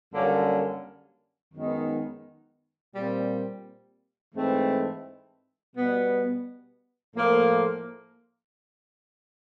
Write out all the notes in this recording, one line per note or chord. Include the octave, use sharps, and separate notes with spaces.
F#2 D3 G3 A#3 C#4
F#2 D#3 G#3 B3 D#4
A#2 G3 C4
G#2 E3 A3 C4
B2 G3 B3
A2 F3 A#3